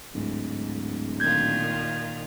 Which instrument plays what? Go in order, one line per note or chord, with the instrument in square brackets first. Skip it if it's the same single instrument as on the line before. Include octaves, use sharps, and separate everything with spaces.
[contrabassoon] D1 [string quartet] G#2
[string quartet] A#2 D#3 F4 [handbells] G6 G#6